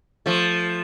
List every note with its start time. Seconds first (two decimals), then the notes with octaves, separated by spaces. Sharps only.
0.26 F3 A3